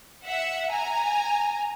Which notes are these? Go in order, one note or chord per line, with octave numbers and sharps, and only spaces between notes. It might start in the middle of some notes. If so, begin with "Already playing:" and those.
E5 F#5
G#5 A#5